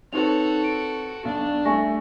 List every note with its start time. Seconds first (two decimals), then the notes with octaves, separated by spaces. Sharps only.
0.13 C4 D#4 F#4 A4 B4 C#5 F7
0.64 D7
1.25 B1 D4
1.65 G3 A3 E4 G#5 C#6 A#6